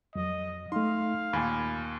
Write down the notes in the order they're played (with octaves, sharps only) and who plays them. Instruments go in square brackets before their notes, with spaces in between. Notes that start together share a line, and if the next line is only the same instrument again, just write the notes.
[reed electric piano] F2 F#3 [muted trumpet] D#5
[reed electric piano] A3 D#4 [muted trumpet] F5 [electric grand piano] C6
[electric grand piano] D#2 A#2 [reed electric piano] G#5 B5